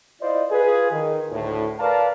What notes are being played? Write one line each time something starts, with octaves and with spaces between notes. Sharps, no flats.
E4 F4 C5 D5 D#5
F4 G#4 B4
D#3
D2 A2
A#4 B4 D5 F5 A5 A#5